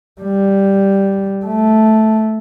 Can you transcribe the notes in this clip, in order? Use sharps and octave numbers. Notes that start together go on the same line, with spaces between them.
G3
A3